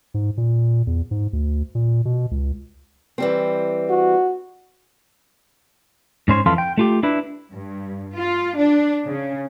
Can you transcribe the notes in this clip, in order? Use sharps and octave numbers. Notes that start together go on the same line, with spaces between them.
G#2
A#2
E2
G#2
D2
A#2
B2
C#2
E3 G3 C4
F#4
G#2 C#4 C5 C#5
F2 E3 A4 F5 C6
G5
A3 F4 G4
D4 E4 B4
G2
F4
D4
C#3